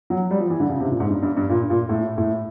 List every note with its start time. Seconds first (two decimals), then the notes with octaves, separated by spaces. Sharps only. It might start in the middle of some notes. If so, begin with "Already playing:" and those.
0.10 F#3
0.31 G3
0.40 F3
0.50 E3
0.60 D3
0.70 C#3
0.80 C3
0.90 A#2
1.00 G#2
1.10 G2
1.23 G2
1.37 G2
1.49 A#2
1.70 A#2
1.89 A2
2.18 A2